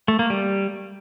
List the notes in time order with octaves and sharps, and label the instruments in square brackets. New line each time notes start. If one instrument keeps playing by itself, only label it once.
[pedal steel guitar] A3
A#3
G3